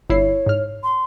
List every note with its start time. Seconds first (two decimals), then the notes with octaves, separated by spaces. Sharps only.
0.10 G1 E4 C#5 C7
0.46 G#2 F6
0.83 C6